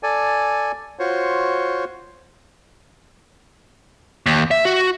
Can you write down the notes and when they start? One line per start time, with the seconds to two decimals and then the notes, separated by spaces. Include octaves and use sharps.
0.03 A4 D5 G#5
0.99 F4 F#4 C5 C#5
4.26 D#2
4.51 E5
4.65 F#4